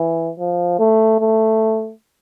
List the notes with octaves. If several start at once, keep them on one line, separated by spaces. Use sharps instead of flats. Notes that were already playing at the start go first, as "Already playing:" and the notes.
Already playing: E3
F3
A3
A3